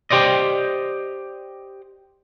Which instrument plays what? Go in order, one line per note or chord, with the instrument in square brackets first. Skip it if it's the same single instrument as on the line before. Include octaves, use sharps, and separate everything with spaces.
[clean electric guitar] G4 C5 D5 D#5